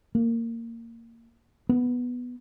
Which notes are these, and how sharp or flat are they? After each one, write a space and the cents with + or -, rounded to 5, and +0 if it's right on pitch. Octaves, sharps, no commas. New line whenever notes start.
A#3 -20
B3 +0